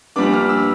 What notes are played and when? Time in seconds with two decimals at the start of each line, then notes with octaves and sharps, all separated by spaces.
0.16 A#1 A#2 G3 B3 D4 D6
0.33 F6
0.49 E6